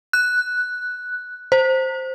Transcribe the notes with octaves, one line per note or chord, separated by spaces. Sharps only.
F#6
C5